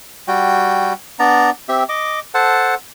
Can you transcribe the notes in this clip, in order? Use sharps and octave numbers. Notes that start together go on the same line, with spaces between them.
G3 F#4 G5
B3 D4 D5 A#5
C4 G4 E5
D#5 D6
A4 C5 F#5 A5